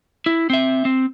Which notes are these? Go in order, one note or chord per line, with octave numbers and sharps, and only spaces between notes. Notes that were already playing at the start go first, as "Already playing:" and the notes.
E4
C4 E5
C4